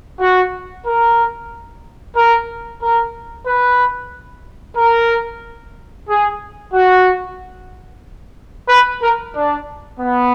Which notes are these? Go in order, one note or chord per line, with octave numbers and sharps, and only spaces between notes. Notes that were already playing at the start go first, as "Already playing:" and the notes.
F#4
A#4
A#4
A#4
B4
A#4
G#4
F#4
B4
A#4
D4
B3